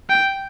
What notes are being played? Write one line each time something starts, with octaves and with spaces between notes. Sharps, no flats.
G5